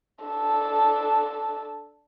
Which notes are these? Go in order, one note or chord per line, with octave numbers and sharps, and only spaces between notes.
D4 A4